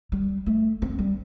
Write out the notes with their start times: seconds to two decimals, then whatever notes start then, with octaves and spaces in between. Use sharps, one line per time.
0.12 G3
0.46 A3
0.82 C4
0.99 G3